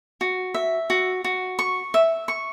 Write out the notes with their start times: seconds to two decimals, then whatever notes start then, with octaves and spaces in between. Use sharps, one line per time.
0.21 F#4
0.54 E5
0.90 F#4
1.24 F#4
1.59 C#6
1.94 E5
2.28 C#6